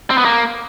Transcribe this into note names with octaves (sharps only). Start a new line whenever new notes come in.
C4
B3
A#3